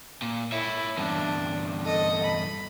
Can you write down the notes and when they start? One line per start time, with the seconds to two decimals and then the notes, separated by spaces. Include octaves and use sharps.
0.22 A#2
0.52 E4 C#5 E5
0.98 E2 G2 D4
1.84 A4 D#5
2.24 B5